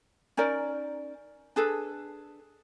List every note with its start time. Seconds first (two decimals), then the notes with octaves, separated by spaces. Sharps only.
0.37 C#4 D#4 A#4 D5
1.56 D4 G#4 A4 B4